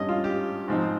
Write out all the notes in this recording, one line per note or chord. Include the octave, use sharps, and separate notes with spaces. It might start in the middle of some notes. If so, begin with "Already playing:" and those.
Already playing: G#1 G2 G3 C#4 D#5
F4
G4
G#2 F3 C4 D#4